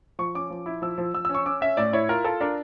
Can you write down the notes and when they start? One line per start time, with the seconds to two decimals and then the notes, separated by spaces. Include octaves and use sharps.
0.19 F3 C#6
0.35 C#4 D6
0.50 F3
0.66 E4
0.82 F3 E6
0.98 F3
1.14 F3 E6
1.25 C#4 E6
1.34 C#6
1.46 C#4 D6
1.61 C#4 E5
1.77 A2 D5
1.93 E4 C#5
2.09 F4 A#4
2.25 F4 A4
2.41 D4 A#4